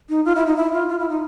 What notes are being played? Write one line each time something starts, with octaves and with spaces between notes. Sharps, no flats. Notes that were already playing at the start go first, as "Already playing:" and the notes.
D#4
F4
E4
D#4
E4
F4
F4
E4
D#4